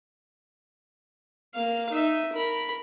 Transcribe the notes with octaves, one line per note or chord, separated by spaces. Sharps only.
A#3 F5
D#4 E5
A#4 B5